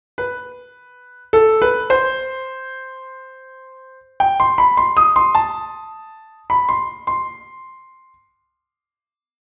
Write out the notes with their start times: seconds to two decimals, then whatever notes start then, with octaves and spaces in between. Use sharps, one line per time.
0.18 B4
1.33 A4
1.62 B4
1.90 C5
4.20 G5
4.40 C6
4.58 B5
4.77 C6
4.97 D#6
5.16 C6
5.35 A5
6.50 B5
6.69 C6
7.07 C6